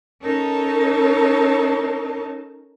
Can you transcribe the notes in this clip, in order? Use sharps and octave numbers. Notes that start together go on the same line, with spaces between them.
C#4 D#4 A4 A#4 C#5 A5